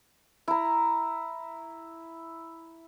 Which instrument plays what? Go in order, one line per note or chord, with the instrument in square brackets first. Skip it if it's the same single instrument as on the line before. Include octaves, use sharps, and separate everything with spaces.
[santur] E4 A#5